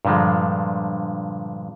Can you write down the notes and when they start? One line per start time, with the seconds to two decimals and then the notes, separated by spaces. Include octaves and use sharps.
0.05 G2 A#2 D3 F3 G#3